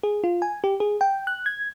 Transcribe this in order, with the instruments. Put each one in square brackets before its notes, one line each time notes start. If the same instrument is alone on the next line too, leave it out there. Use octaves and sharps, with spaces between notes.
[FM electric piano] G#4
F4
G#5
G4
G#4
G5
F#6
G#6